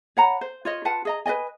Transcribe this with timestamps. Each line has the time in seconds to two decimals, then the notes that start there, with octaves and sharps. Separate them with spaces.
0.17 C#5 F#5 A#5 B5
0.41 C5
0.65 F4 C#5 D#5
0.85 F4 B4 F#5 A5
1.05 G#4 D#5 A#5
1.26 B4 D5 D#5 G#5